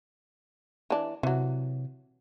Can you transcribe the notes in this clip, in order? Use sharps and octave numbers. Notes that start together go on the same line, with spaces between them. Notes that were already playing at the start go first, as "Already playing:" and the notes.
E3 D4
C3 E3 F#3